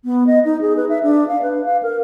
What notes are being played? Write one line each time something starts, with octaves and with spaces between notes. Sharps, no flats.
B3
D#5
D#4
G#4
B4
E5
D4
F5
B4
F5
A#4